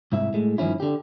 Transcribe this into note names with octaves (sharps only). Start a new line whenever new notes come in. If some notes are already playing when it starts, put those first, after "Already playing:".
C2 G#2 E4 E5
A2 G#3
G2 D#3 F3 C#4 E4
D3 G4